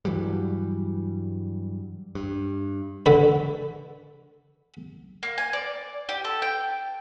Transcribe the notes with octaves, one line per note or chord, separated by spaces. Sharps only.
G2 E3 F#3 G3
G2
D3 B4
A#3
G#5
D5
G4
A4
G5